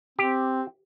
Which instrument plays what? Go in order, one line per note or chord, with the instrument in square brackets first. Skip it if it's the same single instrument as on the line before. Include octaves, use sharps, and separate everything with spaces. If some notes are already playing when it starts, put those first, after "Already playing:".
[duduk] C4 [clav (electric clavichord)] G4